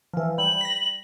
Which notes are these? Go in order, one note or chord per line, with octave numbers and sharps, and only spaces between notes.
E3 F3
G3 F#7
A#6 B6